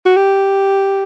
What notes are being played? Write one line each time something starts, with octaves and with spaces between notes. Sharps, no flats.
F#4
G4